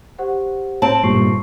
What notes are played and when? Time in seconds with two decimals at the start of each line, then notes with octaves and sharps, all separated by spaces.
0.19 G4 C5 F#5
0.82 C4 A5 D7 F#7
1.03 G2 A#2 G3 C#6 C7